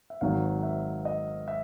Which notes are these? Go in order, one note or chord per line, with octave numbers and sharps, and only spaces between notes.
E5
G#1 G#2 D#3 F#3 F5
E5
D#5
E5